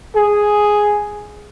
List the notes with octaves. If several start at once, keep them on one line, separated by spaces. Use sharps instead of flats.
G#4